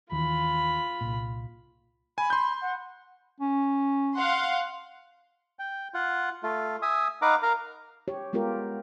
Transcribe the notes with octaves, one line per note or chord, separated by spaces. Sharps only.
D#2 D#3 E3 F4 B5
C2 A#2
G#5 B5
C6 G6
F#5
C#4
F5 F#5 C6
G5
F4 F#5
A3 F4
E5 G#5 D#6
D#4 B4 F5 F#5 A#5 D6
A#4 F5 A#5
G4 C#5
G#3 B3 F4 G4 A#4